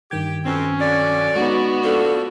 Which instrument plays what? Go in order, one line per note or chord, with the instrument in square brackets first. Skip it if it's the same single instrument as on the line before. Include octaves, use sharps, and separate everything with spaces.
[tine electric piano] G2 D#3 G#6 [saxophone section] G4
[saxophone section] F2 B2 C4 [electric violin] C#4
[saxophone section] D3 F#3 D5
[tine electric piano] G#3 D#4 [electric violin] B3 F#4 [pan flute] C#6
[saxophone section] A2 F3 D4 [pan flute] A4